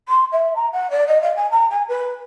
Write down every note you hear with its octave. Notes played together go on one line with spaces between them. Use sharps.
C6
E5
A#5
F#5
D5
D#5
F5
G#5
A#5
G#5
B4